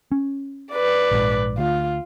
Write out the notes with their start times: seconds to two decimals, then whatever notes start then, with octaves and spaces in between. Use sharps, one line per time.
0.12 C#4
0.73 B4 D5
1.11 A#1 G#2
1.58 D2 F4